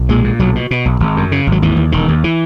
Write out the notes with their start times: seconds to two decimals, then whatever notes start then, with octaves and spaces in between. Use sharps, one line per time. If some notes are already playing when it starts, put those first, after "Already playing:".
Already playing: B1
0.09 A#2 G#3
0.24 A#2
0.39 B1 F#3
0.55 B2
0.71 B2
0.85 B1
1.00 G#1
1.16 F#2
1.32 C#3
1.47 G#1
1.52 F#3
1.62 D#2 E3
1.77 D#2
1.92 E1 D#3
2.08 D#2
2.24 E3